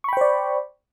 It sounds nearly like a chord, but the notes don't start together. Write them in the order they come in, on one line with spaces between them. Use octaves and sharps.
C#6 B5 G5 C5 D5